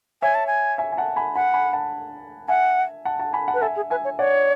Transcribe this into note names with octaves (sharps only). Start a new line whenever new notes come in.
C#5 E5 G#5
A5
G#5
E5 G#5
G#5
F#5 A5
G#5 B5
F#5 G#5 B5
G#5 B5
F#5 A5
E5 F#5 G#5
F#5 A5
F#5 A5
G#5 B5
F#5 A5
B4
A4 E5 G#5
G#4
B4 E5 G#5
C#5
C#5 D5 F#5